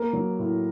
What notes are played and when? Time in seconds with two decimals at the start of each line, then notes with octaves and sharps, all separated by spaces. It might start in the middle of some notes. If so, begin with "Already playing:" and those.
Already playing: A#3 A#4
0.13 F#3
0.39 A2